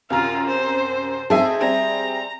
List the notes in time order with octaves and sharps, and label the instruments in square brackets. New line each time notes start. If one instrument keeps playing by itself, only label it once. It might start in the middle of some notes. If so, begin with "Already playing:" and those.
[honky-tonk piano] F#2 C3 A#5 [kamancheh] F4 F5
[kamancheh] C5
[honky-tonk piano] C4 D#4 A5 [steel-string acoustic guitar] G#4 E5 G#5
[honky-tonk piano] G3 C4 [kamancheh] A#5